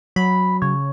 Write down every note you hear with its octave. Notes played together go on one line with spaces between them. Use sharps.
F#3 B5
C#3 C#5